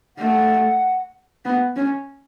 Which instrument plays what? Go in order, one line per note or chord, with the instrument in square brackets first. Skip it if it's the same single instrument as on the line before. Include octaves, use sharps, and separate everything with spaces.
[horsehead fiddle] A3 [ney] F#5
[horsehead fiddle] B3
C#4